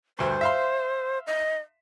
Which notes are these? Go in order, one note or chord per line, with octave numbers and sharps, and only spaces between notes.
D2 G2 C5
E5 F5 C6
D#5